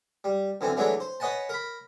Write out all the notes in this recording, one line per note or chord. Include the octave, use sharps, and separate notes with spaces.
G3
F#2 D3 E3 C4
E3 F#3 G#3 A3 D4 E4
C5
B4 C#5 D#5 F#5 G#5 A5
A#4 B5